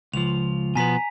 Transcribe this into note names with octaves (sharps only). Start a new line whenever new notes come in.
C#2 F3 F7
B2 F3 B3 G#5 A#5 B6